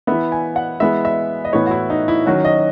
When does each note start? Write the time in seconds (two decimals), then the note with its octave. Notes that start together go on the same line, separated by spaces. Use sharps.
0.07 E3 B3 E5
0.32 G#5
0.56 F#5
0.80 E3 G#3 B3 E5
1.05 E5
1.45 D#5
1.53 A2 E3 B3 C#5
1.66 F#4
1.71 E4
1.90 D#4
2.08 E4
2.26 D#3 F#3 C#4 F#4
2.45 D#5